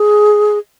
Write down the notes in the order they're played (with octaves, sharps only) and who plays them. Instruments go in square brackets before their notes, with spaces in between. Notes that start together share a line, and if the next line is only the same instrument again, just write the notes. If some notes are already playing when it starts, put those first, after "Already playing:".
Already playing: [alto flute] G#4